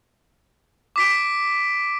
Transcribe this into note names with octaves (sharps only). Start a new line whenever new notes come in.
D6 B6 D7